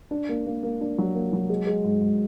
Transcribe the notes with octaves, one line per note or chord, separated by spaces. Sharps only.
D4
A#3
A#3
A#3
D4
F#3
A#3
F#3
G#3
G#3
G#2
G#2